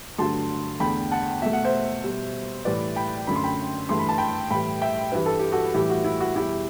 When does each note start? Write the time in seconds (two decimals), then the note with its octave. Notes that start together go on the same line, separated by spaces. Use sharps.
0.18 G2 D3 F#3 A3 A5 C6
0.80 E2 D3 A3 G5 B5
1.11 F#5 A5
1.41 B2 A3 E5
1.53 F#5
1.65 C5 E5
2.04 B2 G3
2.65 A2 E3 G3 B4 D5
2.96 G5 B5
3.27 F#2 D3 A3 B5
3.36 C6
3.44 G5 B5
3.89 G2 E3 A3 C6
3.99 B5
4.09 A5
4.18 G5 B5
4.50 A2 E3 G3 G5 B5
4.82 E5 G5
5.12 G2 E3 G3 B4
5.26 A4
5.39 G4
5.52 F#4 A4
5.74 A2 E3 G3 E4 G4
5.90 F#4
6.04 E4
6.21 F#4
6.36 E2 B2 G3 E4 G4